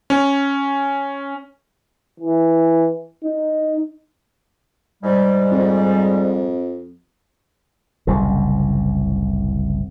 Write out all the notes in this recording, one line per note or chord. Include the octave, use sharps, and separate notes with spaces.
C#4
E3
D#4
G#2 G3
F2
F#1 C2 A2 C#3